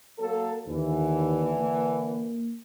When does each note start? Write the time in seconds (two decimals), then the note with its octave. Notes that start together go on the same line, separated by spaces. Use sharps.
0.19 F#3 A#3 A4
0.67 D#2 D3 E3
1.59 A#3